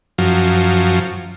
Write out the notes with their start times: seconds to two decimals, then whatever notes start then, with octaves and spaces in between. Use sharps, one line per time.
0.18 F#2 F3